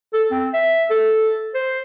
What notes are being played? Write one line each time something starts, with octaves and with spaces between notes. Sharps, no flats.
A4
C4
E5
A4
C5